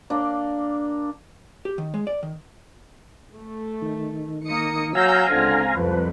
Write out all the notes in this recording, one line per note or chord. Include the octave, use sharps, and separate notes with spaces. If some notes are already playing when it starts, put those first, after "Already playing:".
A#3 D4
G4
D#3
G#3
D5
D#3
A3
D#3
A#3 D#6 C#7
F#3 F5 F#5 G#5 A#5 E6 G6
C#2 D3 C4 F4
C2 F2 F3 B4